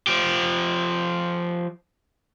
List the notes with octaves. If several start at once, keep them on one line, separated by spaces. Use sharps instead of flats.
F3 G4